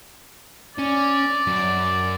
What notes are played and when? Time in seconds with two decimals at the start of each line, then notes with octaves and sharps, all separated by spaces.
0.79 C#4 D5
1.47 F#2